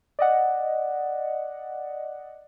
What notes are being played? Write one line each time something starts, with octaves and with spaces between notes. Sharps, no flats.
D5 D#5 F#5